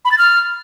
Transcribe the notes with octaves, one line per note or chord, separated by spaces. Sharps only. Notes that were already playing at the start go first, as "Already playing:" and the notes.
B5
A6
F6